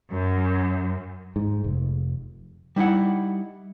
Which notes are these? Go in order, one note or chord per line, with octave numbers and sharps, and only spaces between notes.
F#2
G#2
F1
G3 D#4 E4 F#5